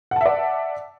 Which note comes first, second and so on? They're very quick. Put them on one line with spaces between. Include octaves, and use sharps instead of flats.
F#5 A5 E5 D5